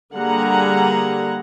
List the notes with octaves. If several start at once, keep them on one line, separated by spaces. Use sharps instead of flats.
D3 G3 A#3 G#4 F#5 A#5